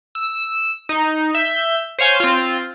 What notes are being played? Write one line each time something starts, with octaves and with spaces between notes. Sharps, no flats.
E6
D#4
E5 G6
C5 C#5 F5 G#5 C6
C4 F4